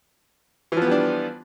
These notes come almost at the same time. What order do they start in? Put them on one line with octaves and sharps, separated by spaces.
E3 F3 B3 G3 D4